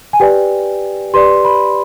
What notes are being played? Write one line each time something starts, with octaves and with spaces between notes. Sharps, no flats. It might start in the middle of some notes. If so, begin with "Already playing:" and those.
G#5
G4 B4 D5 G5
G4 B4 D5 C6
B5